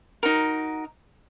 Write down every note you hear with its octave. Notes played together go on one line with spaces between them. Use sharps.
D#4 F#4 A#4